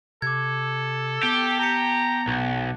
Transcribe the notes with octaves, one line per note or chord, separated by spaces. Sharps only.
C3 A4 D6 G#6
B3 G4 A5
A5 A#5 C#7
B1 F#6